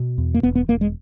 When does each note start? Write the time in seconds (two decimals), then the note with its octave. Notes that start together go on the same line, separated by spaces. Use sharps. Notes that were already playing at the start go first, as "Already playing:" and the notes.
Already playing: B2
0.18 E2
0.34 A#3
0.43 E1 B3
0.55 B3
0.68 E1 A#3
0.81 G#3